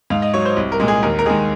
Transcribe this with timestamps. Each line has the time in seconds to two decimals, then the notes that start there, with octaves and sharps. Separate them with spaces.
0.10 G#2 F5
0.22 D#5
0.34 F#3 C#5
0.45 C5
0.56 C2
0.72 A#4
0.80 A#2 G#3
0.88 G#4
1.02 D#2 A#4
1.19 A#4
1.26 D#3 G#3 G#4